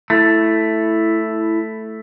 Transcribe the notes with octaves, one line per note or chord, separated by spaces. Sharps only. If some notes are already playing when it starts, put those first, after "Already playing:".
A3 E4